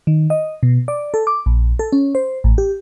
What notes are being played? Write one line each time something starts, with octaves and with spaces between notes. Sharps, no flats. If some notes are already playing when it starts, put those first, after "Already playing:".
D#3
D#5
B2
D5
A4
D6
A#1
A4
C#4
C5
A1
G4